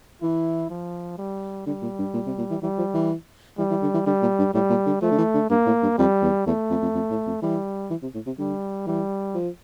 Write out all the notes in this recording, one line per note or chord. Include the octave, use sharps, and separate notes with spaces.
E3 E4
F3
G3
D3 G3
A#2
G2
A#2
C3
A#2
E3
E3 G3
F3
E3
E3 G3
E3
D3
E3
D3 G3
A#2
G2
A2 G3
A#2
D3
F3 A3
D3
E3
D3
G2 A#3
A2
G2
F2 G3
E2
E2 A3
F2
F2
F2
A2
F2
E3 G3
E3
C3
A2
C3
D3 G3
E3 G3
F3